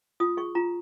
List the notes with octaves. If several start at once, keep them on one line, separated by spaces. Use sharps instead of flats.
F4 D#6
G#4 C#6
F4 A#5